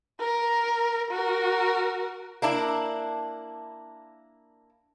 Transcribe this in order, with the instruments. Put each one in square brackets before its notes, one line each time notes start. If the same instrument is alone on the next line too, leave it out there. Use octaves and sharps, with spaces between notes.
[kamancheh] A#4
F#4 A#4
[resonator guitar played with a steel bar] A#3 D4 E4